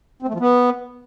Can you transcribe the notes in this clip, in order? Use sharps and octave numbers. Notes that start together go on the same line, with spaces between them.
C4
A3
F3
B3